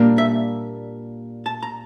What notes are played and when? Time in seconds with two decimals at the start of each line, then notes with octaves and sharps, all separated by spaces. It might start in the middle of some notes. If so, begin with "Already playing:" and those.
Already playing: A#2 G3 A#3 D4
0.18 E5
1.46 A5
1.63 A#5